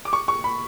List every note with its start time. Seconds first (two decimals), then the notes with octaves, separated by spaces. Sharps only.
0.05 D6
0.13 C#6
0.28 C#6
0.44 B5